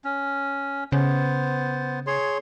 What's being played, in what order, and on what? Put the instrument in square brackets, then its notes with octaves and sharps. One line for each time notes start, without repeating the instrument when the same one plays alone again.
[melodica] C#4
[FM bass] C#3 [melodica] B3 C5
[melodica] G#4 C#5 C6